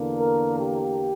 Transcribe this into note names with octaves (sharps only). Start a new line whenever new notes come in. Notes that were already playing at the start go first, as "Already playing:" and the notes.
Already playing: E2 D3 A#3
A#4
G4